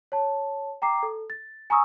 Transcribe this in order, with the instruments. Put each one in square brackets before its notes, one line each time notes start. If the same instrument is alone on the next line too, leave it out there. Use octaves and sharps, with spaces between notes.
[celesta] C#5 A5
G5 A#5 D6 C7
A4
A6
G#5 A#5 C#6 D#6 E6